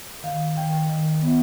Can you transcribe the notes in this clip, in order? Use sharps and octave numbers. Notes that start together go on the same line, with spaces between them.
D#3 F5
D#3 G5
D#3
B3